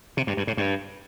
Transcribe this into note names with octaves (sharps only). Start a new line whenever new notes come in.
C3
G2
G2
A2
G2